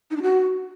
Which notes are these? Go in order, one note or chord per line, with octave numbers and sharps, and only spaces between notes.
D#4
D4
F#4